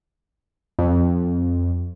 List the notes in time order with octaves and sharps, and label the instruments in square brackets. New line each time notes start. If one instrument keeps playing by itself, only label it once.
[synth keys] F2